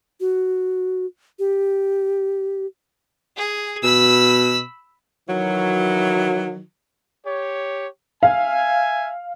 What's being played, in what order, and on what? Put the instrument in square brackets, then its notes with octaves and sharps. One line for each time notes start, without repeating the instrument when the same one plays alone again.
[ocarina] F#4
G4
[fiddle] G#4
[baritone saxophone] B2 [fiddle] B5 E6
[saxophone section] D#3 E3 F#3
[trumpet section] G4 C#5
[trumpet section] E5 G#5 [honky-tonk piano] F5